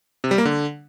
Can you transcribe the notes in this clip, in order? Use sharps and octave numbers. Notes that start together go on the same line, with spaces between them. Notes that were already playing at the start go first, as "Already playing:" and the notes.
C3
G3
A#3
D3